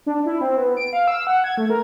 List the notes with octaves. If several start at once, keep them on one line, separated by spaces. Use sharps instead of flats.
D4
E4
C4
B3
D7
F5
E6
F#5
G#6
A3
A#4